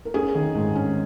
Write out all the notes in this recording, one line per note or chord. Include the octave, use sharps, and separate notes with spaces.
A#4
C#4 G#4
D#3
G#2
C#4